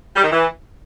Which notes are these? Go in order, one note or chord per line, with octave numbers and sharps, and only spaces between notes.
G3
D#3
E3